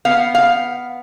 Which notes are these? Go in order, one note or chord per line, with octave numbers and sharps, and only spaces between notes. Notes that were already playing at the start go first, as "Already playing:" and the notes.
B3 F5
F5